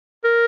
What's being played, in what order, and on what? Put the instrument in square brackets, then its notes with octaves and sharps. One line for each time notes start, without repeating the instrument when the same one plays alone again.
[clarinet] A#4